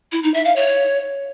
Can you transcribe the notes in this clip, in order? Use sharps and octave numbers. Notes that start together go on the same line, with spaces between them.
E4
D#4
E5
F5
C#5